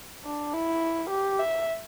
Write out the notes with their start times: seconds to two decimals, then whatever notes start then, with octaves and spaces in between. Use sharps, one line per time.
0.25 D4
0.54 E4
1.11 G4
1.39 E5